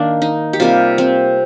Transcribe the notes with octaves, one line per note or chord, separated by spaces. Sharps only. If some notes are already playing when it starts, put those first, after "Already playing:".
Already playing: D#3 A#3 D4
D#4
G4
C3 G3 A#3 F4
C4